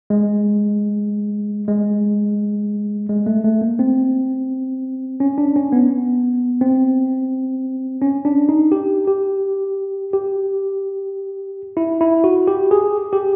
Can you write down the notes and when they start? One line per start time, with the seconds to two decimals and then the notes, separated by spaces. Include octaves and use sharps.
0.10 G#3
1.68 G#3
3.09 G#3
3.26 A3
3.44 A3
3.61 A#3
3.79 C4
5.20 C#4
5.38 D4
5.56 C#4
5.72 B3
6.61 C4
8.02 C#4
8.25 D4
8.49 D#4
8.72 G4
9.07 G4
10.13 G4
11.77 E4
12.01 E4
12.24 F#4
12.48 G4
12.71 G#4
13.13 G4